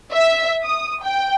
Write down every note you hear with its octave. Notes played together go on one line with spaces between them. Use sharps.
E5
D#6
G5